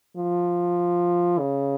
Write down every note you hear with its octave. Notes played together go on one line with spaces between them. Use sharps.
F3
C#3